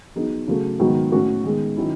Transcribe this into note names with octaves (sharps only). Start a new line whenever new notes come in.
F#3 B3 D#4 G#4
C#3 F#3 A3
G#2 D#3 F#3 B3 F#4
A2 F#3 C#4 F#4
D#3 G#3 B3
D#3 F#3 C#4 E4